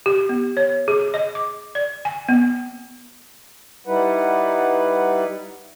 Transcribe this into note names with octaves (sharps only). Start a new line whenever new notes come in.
G4
B3
C#5
G#4
D#5
D6
D5
G#5
B3
G3 D#4 E4 B4 F#5